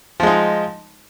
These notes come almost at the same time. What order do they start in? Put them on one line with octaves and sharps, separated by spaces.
F3 G#3 D#4